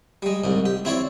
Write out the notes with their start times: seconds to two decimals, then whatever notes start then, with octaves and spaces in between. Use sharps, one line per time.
0.22 G3 G#3
0.44 C2 G#2
0.66 G4
0.85 C4 E4 C#5 D5